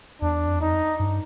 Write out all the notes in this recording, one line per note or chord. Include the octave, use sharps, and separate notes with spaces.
E2 D4
F2
E2
F2 D#4
G2